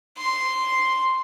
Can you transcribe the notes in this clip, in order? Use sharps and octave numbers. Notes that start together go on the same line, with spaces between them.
C6